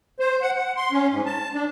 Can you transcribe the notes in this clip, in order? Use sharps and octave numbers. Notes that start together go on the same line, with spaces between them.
C5
F#5
F#5
C6
C#4
G#2
A5
D4